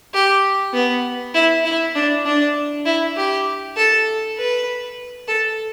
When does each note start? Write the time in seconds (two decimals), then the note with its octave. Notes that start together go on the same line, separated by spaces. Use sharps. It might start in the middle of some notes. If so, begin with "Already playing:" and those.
0.14 G4
0.74 B3
1.34 E4
1.65 E4
1.95 D4
2.25 D4
2.85 E4
3.17 G4
3.77 A4
4.37 B4
5.28 A4